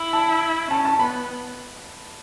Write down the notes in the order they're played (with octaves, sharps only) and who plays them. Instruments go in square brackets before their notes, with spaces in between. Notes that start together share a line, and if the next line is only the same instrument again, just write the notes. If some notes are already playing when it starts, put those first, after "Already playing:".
Already playing: [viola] E4
[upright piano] A5
[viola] C#4 [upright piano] A5
[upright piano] A5
[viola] B3 [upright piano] B5